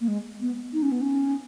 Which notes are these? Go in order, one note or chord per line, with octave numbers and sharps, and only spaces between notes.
A#3
G#3
B3
D#4
C#4
B3
C#4